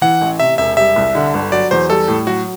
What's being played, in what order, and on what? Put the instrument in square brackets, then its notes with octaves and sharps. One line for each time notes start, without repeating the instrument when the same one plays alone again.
[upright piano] E3 [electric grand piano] F#5
[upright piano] A1
[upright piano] C3 [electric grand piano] E5
[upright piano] E1 [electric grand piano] E5
[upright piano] G3 [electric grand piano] E5
[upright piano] C2
D3
G1
[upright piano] F#3 [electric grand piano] D5
[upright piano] E2 [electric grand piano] C5
[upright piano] G3 [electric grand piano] A4
[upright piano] A2
[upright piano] F#3 [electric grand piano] F#4